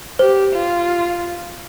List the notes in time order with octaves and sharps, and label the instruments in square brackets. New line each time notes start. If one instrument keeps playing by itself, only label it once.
[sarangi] G4 [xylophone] C5
[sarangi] F4